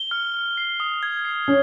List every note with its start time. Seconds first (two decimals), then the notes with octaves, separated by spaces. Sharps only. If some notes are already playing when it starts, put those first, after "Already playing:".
Already playing: G7
0.11 F6
0.34 F6
0.57 C7
0.80 D#6
1.03 G#6
1.25 C7
1.48 C#4